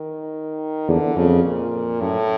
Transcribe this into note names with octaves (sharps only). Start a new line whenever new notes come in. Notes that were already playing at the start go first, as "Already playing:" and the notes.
Already playing: D#3
E2 D3
F2 C#3
A#2
F#2 A2